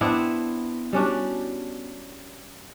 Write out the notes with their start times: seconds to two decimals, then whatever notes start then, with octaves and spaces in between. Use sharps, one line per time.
0.01 B3 C4 D4 E4
0.93 G3 C#4 D4 F#4